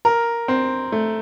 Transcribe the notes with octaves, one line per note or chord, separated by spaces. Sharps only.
A#4
C4
A3